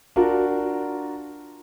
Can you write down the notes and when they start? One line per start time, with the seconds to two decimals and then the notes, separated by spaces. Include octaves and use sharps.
0.16 D4 F4 F#4 A#4